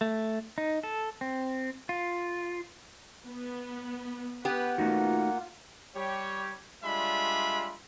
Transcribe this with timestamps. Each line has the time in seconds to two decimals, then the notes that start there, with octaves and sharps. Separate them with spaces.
0.01 A3
0.58 D#4
0.83 A4
1.21 C4
1.89 F4
3.27 B3
4.45 B3 G4 B4 F#5
4.78 A3 A#3 D#4 F4 F#4 F#5
5.95 G3 G4 C#5
6.84 G3 G#3 D4 F4 E5 B5